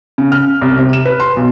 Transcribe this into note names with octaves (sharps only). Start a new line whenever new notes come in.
C#3
F6
C2
C3
E7
B4
C6
B1